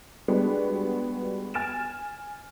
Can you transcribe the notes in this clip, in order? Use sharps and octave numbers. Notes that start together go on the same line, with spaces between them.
G3 G#3 B3 D4 F#4
G#5 F6 A6 D7 E7